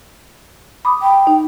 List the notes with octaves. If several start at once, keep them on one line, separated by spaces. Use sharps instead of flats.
B5 D6 D#6
G5
D#4